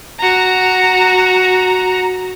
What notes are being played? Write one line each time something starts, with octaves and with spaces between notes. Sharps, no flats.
F#4 A#5